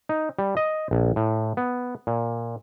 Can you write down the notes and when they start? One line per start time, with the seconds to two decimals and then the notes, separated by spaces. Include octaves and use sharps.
0.09 D#4
0.39 G3
0.57 D#5
0.91 A#1
1.16 A2
1.57 B3
2.07 A#2